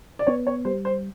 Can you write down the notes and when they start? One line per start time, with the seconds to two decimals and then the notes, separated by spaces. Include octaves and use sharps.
0.19 D5
0.27 B3 C#5
0.47 C#5
0.65 G3 C5
0.85 C5